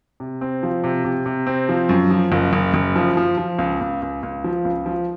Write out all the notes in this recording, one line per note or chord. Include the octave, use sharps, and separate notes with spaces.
C3
C4
F3
C3
C3
C3
C4
F3
F#2
F3
F#1
F#1
F#1
F3
F3
F3
C#2
C#2
C#2
C#2
F3
C#2
F3